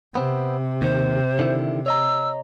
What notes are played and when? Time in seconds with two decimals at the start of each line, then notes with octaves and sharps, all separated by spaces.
0.15 C3 B3 C4
0.82 D#2 D#3 C5
1.39 D3 D#3 E4
1.86 C#5 D#5 A#5 E6